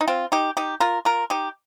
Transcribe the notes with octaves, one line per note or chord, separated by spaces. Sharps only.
D#4
C4 F4
D#4 G4
D#4 G4
F4 A#4
F4 A#4
D#4 G4